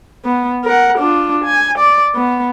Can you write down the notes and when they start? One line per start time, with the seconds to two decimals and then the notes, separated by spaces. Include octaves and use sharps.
0.25 B3
0.65 A#4 F#5
0.99 D4 F4
1.45 G#5
1.79 D5
2.15 B3